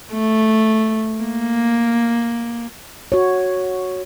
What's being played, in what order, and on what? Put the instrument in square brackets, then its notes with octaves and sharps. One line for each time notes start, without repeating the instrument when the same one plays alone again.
[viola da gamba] A3
A#3
[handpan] F#4 C#5